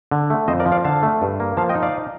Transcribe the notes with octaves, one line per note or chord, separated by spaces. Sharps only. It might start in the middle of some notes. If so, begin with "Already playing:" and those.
D3
A3
F2 C5 D#5
A#4 D5
F3
D5 F5
D3 F5 A5
A3
G2
A#3
F3 F5 A5
D#5 G5
D#4
D5 F5